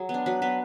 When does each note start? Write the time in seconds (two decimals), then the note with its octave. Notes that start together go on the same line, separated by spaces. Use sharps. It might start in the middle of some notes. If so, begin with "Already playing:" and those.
Already playing: F#3 G#4
0.09 B3
0.14 D4
0.26 F#3 B4
0.42 B3 D4 B4